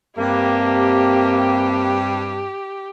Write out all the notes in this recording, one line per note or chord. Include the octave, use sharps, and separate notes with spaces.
G2 C3 A#3 G4